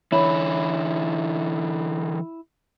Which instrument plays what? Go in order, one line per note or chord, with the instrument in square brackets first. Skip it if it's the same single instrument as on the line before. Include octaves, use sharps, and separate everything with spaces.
[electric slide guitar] D3 E3 [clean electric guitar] E4 [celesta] C#5 B5